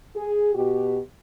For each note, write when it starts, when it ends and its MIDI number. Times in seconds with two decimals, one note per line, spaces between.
0.15 0.55 68
0.55 0.99 47
0.55 0.99 66
0.55 0.99 67